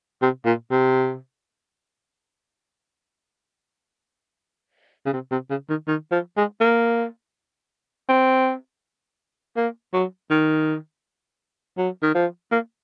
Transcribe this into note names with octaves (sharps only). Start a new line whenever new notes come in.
C3
A#2
C3
C#3
C3
C3
C#3
D#3
D#3
F3
G#3
A#3
C4
A#3
F#3
D#3
F#3
D#3
F3
A#3